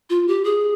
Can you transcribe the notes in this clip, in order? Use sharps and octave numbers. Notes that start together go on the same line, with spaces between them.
F4
G4
G#4